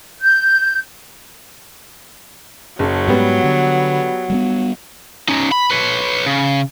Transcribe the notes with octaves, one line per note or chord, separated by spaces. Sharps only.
G6
F#1 F#3
G#2 G3 B3
D3
G3 G#3 B3
C#4 D#4
B5
B4 C#5
C#3